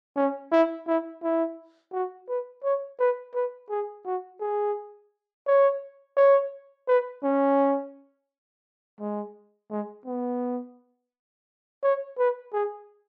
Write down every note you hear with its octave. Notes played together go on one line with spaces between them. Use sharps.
C#4
E4
E4
E4
F#4
B4
C#5
B4
B4
G#4
F#4
G#4
C#5
C#5
B4
C#4
G#3
G#3
B3
C#5
B4
G#4